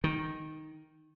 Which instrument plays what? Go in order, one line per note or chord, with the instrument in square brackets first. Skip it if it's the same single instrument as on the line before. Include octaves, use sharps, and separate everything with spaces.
[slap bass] D#3